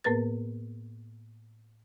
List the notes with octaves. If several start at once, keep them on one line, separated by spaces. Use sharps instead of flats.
A2 A#3 B3 A#4 B4 A6